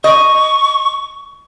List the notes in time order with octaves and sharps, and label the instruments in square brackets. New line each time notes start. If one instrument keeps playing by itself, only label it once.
[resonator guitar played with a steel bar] D#5 [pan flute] C#6